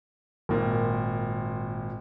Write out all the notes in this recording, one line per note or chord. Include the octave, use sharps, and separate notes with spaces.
G#1 A#2